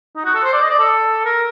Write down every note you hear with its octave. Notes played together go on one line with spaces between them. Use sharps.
D#4
F#4
A4
C5
D5
D#5
D5
A4
A#4